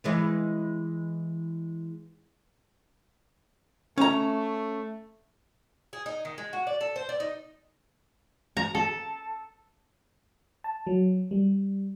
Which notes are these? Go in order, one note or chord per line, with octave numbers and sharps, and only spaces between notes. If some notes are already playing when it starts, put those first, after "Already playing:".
E3 G#3 B4
A3 C#4 A#5
G#4
D#4
D#3
G#3
F#4
D5
A4
C5
D5
D#4
A#5
A4
A5
F#3
G3